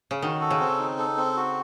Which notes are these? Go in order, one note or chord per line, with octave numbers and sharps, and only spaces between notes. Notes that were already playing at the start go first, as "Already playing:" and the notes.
C#3
D#3 F#4
A4
C#3
C4
D#4
A4
C4
F#4